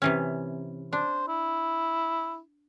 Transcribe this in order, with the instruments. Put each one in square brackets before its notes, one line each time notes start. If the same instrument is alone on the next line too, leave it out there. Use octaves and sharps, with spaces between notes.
[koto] C3 E3 C#4
[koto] D4 [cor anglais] C5
[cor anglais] E4